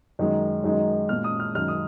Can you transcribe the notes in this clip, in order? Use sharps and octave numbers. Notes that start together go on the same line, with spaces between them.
F#2 D#3 G#3
F#2 D#3 G#3
A#2 G#3 F6
D#6
F6
F#2 D#3 G#3 F6
D#6